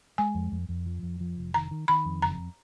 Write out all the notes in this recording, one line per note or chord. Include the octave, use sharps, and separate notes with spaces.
G#3 G#5
F2
F2
F2
F3
F2
F3
F1
D#3 A#5
D#3
D#3 B5
F2
F#1 A#5